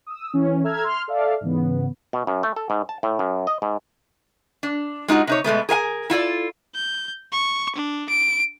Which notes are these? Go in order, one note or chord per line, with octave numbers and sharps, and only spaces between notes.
D#6 E6
E3 C#4
A4 E5 A#5 E6 F6 G#6
C6 F6
A4 D5 E5 F5
G#2 C#3 E3 B3
B2
F#2
A3
A4
G#2
A5
A2
F#2
D#5
G#2
D4
G#3 D#4 F4 F#4
C3 D#4 C#5
B2 G#3 A3 B3
G#4 A#4 F5 G#5
E4 F4 A4 D5
G6
C#6
D4
D7